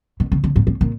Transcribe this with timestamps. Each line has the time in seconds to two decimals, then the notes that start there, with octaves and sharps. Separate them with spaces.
0.20 B2
0.32 C#3
0.44 D3
0.56 G#2
0.67 A2
0.81 A#2